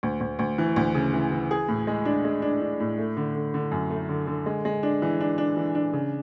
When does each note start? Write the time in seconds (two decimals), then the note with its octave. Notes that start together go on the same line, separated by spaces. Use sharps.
0.03 D2
0.20 D2
0.39 D2
0.58 E3
0.76 D2
0.95 C#3
1.13 E3
1.32 E3
1.51 G#4
1.68 A2
1.87 G#3
2.05 D4
2.25 G#3
2.42 D4
2.62 D4
2.80 A2
2.98 A3
3.17 D3
3.35 D3
3.54 D3
3.72 F#2
3.90 A3
4.09 D3
4.27 D3
4.46 G#3
4.65 G#3
4.83 D4
5.02 E3
5.21 D4
5.38 D4
5.57 E3
5.75 D4
5.93 C#3